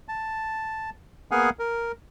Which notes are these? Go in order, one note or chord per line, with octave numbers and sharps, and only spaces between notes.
A5
A#3 B3 G#4 F5 F#5 G#5
A#4